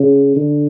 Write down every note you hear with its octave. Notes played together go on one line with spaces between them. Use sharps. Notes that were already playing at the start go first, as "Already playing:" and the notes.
Already playing: C#3
D3